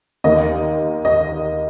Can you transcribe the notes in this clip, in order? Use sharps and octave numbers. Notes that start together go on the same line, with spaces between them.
D#2 D#3 A#3 D#5
D#5